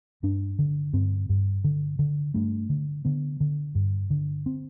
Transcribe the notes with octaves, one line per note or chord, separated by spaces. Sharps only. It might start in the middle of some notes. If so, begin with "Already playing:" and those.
G2 D4
D3
G2 C4
G2
D3
D3
G2 A3
D3
D3 B3
D3
G2
D3
C4